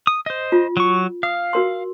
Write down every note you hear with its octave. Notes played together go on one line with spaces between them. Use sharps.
D#6
C5 D#5
F4
F#3 C#6
F5 D#6
F#4 A#4 C6